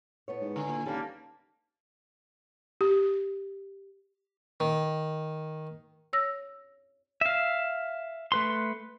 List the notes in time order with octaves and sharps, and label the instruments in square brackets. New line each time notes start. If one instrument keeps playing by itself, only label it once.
[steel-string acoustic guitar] A2 B3 C#5
[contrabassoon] G#2
[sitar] D3 [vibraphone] G#5
[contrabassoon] A#2
[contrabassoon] D#2 [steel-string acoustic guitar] D3 G#3 C#4 [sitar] G3 A#3 [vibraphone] A5
[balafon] G4
[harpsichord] D#3
[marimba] C#5 E6 A#6
[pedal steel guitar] E5 F5
A3 B4 C6